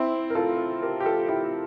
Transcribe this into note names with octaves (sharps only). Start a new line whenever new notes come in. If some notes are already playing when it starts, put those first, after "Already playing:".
Already playing: C4 E4
A#4
F4 A4
G4 A#4
G4
F4 A4
E4 G4